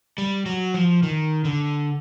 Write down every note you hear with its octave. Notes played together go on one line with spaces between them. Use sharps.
G3
F#3
F3
D#3
D3